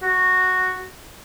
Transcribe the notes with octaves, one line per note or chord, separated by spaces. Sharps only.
F#4